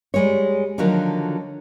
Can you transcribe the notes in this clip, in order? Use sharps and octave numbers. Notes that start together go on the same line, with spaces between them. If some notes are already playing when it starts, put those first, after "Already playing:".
G3 G#3 C#5
D3 D#3 F3 F#3 F#4 A#4